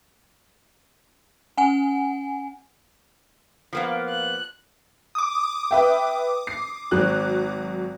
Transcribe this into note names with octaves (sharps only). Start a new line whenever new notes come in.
C#4 F#5 G#5
F3 A#3 B3
F#6
D6 D#6
B4 E5 G5
C7
G#1 F#3 F#6